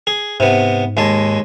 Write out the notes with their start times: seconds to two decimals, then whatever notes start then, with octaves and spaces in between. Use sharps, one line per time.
0.07 G#4
0.40 G#2 C3 B3
0.97 D#2 G#3 A5